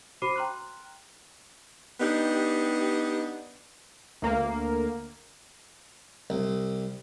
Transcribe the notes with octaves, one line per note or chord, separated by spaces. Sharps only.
F#4 C5 B5 D6 C7 D#7
G5 A#5 C6 F6 F#6
B3 D4 D#4 G4
D2 A#3
C2